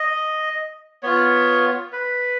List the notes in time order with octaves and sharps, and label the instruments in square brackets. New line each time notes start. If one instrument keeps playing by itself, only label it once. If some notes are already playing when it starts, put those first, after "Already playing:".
Already playing: [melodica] D#5
B3 F4 C#5
B4